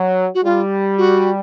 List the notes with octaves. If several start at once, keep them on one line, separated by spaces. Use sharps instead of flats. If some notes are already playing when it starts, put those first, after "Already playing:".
Already playing: F#3
F#4
G3 F4
F#4